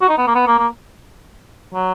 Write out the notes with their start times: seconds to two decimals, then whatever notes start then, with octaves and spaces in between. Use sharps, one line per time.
0.01 F#4
0.09 D#4
0.18 B3
0.27 A#3
0.35 B3
0.47 A#3
0.59 A#3
1.74 F#3